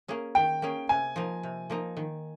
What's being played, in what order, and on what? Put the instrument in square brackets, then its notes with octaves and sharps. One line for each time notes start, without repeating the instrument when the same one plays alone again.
[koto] A#3 C#4 G#4
[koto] D#3 [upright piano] G5
[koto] A#3 C#4 G#4
[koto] C3 [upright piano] G#5
[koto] F3 A#3 D#4
C3
F3 A#3 D#4
D#3